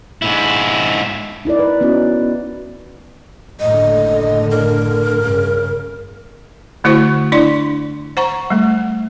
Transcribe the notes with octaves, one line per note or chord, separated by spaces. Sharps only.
G#2 E4
D#4 E4 A#4 D5
B4
B3 C#4 D#4 E4 F#4
F#1 A2 D3 D#5
A#4
G2 C#3
D3 A3 E4 F#4 C5 C#6
D4 E4 D5 C6
C5 F#5 A#5 C#6
G3 A3